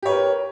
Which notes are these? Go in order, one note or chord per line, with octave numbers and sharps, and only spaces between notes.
G4 A#4 B4 C#5